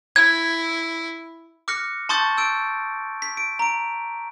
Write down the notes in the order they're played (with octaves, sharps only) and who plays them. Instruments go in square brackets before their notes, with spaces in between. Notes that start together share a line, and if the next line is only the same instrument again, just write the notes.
[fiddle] E4 [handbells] G#6
[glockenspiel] D6 F6 F#6 A#6 C#7
A5 C6 C#6 D#6 G6 A6
E6 G6 D7
B6
D7
A#5 D7